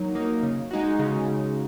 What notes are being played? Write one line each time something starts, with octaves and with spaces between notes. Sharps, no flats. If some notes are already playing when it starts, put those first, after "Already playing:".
Already playing: F#3 A#3 D#4
A#3 D#4
C#3
G#3 D#4 F#4
C#3